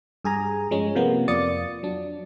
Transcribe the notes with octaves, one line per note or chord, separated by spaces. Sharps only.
G2 G#4 G#5 A#5
F3 G#3 C#4
C3 F3 A#3 B3
F2 F4 D5 D#6 A6 C#7
F#3 D4